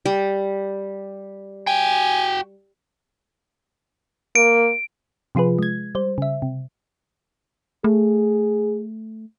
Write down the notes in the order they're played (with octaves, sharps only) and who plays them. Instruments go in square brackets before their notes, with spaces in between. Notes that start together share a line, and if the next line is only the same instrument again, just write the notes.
[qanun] G3
[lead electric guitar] F#4 G5 [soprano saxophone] G#5
[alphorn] A#3 [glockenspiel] D7
[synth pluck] C3 F3 F4 G#4 B4
G#3 G#6
G3 C5
C#3 E5
C3
[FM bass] A3 [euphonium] G#4